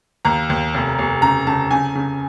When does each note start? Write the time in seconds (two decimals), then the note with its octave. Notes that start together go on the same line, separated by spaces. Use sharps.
0.25 D#2 A#5
0.50 D#2
0.74 F1
0.98 F1
1.22 C#3 A#5
1.47 C#3 A5
1.71 C#3 G#5
1.95 C#3